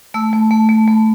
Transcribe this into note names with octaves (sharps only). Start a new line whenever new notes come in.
A3 E6
A3
A3
A3
A3